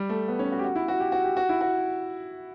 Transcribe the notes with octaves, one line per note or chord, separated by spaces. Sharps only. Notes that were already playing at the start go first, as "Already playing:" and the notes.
Already playing: G3
A3
B3
C#4
F#4
G4
F#4
E4
F#4
G4
F#4
G4
F#4
E4
F#4